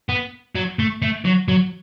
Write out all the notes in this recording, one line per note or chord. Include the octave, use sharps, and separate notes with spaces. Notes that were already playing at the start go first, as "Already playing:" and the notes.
B3
F#3
A3
A3
F#3
F#3